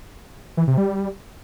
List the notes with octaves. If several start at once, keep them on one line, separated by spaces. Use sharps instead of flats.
E3
C3
G3